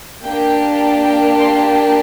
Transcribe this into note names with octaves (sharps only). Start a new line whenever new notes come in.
A#3 D4 G4 G5
G5
C6